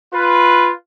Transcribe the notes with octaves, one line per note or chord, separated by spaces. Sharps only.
F4 B4